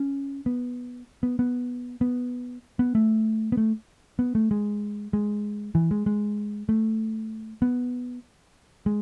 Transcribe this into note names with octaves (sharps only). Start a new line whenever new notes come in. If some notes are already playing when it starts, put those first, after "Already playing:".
Already playing: C#4
B3
B3
B3
B3
B3
A3
B3
A3
B3
A3
G#3
G#3
E3
G#3
G#3
A3
B3
G#3